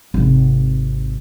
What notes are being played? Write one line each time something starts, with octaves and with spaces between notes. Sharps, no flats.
G#1 C3